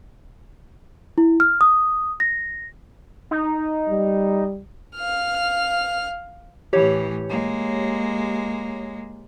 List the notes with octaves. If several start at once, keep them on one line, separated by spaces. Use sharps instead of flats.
E4
F6
D#6
A#6
D#4
G3
F5 F6
A2 E3 G4 C#5
G#3 A#3